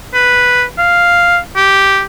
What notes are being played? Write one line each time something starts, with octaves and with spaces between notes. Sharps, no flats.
B4
F5
G4